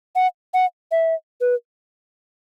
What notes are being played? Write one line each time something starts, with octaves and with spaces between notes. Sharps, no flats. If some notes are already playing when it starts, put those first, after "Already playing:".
F#5
F#5
E5
B4